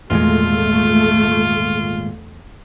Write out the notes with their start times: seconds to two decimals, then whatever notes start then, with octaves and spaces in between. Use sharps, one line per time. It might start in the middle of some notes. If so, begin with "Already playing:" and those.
0.11 G#1 E2 A#2 G#3 A3 F4